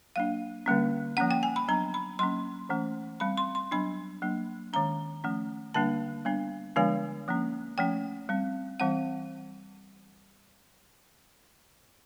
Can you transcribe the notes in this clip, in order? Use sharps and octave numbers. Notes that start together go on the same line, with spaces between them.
F#3 A#3 D4 F5
D3 G3 A#3 C#4
F3 A#3 C#4 F#5
G5
G#5
B5
F#3 B3 D4 A#5
B5
F#3 A#3 C#4 C6
E3 A3 C#4
G3 C4 B5
C6
C6
F#3 B3 D4 B5
F#3 A#3 D4
D#3 G#3 C#4 A#5
F3 A3 C#4
D3 G3 A#3 D4 A5
G3 B3 D4
D3 F3 G#3 B3 D4 G#5
F3 A#3 C#4
F3 A3 C#4 G5
G3 C4
E3 G3 C4 F#5